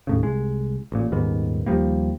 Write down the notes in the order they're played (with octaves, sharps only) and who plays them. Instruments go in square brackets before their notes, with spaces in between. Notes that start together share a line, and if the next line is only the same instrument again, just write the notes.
[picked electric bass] D#2 A2 C#3
C2 G#3
A1 A#2
D#1 G#2 D#3 B3
D#2 F3 G3 A#3